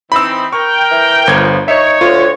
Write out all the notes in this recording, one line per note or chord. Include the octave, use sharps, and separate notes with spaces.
E3 C4 D#4 B5 E6
A#4 G5 C#6
E3
G1 F3 G#6
D#4 C#5 E5
D2 F4